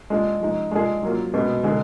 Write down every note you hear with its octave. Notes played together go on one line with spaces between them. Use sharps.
G#3 D4 F4 G#4
F3 G#3 D#4
G#3 D4 F4 G#4
F#3 A#3 F4
B2 G#3 B3
D3 G#3 D#4 G#4